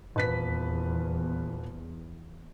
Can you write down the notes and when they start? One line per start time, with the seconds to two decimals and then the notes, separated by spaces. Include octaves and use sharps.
0.16 D#1 E2 B4 B6